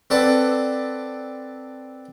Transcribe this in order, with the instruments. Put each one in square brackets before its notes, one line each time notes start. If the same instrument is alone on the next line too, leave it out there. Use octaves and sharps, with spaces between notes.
[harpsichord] C4 A4 B4 D5 F#5 A5